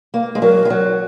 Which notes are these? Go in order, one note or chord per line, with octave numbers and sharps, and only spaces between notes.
A#3
G#3
F#3 A#4
G#3
F#3